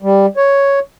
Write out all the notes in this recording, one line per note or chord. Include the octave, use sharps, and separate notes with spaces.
G3
C#5